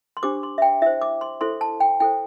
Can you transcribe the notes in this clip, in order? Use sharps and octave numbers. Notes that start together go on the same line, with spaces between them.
C6
D4 G4 C5 D6
C6
E5
G5
E4 C5 E5
D6
C6
E4 A4 C5 C6
A5
G5
E4 A4 C5 G5